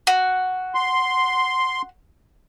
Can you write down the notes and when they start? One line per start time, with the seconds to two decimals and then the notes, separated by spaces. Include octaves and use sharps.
0.07 F#4
0.75 C6